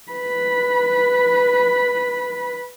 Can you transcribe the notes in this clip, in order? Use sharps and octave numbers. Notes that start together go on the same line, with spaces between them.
B4 B5